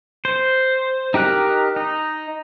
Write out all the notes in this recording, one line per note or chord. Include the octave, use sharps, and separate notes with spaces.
C5
D#4 G4 A#4 F#6
D#4